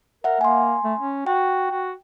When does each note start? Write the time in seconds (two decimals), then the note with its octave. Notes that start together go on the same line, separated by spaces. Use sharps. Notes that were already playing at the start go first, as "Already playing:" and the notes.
0.24 A#4 E5 F#5
0.41 A#3 G#5 C6
0.84 A3
0.99 C#4
1.26 F#4 G5
1.71 F#4